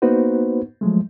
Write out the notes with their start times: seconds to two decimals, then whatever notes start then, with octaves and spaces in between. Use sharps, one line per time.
0.02 A#3 B3 D#4 F#4 B4 C5
0.81 F3 F#3 G#3 A3